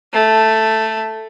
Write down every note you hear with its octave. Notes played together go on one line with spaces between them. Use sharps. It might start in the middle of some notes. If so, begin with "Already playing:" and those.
A3